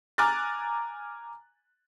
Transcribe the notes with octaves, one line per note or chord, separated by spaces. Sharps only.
G#5 A#5 D6 F6 F#6 A6